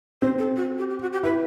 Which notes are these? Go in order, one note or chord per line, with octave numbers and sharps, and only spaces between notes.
C4 C5
A4
F#4
G4
G4
F#4
G4
E4 B4